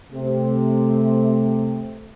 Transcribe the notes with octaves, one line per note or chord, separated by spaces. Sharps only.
C3 A3